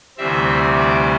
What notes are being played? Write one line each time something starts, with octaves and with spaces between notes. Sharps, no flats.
D2 C3 E3 G3 C4 E5
D5